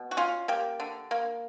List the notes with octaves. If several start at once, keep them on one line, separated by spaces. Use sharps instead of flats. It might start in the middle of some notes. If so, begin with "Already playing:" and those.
Already playing: B2
F#4
C#4 F4
A#3 G4
D3
A#3